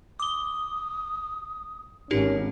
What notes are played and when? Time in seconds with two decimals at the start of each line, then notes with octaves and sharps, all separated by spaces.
0.20 D6 D#6 G7
2.11 G#1 C#4 D#4 G4 A#4